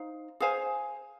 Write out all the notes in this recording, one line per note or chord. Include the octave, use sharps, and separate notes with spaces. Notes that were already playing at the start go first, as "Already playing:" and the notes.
Already playing: D#4 C5 F5
G#4 C5 F5 G#5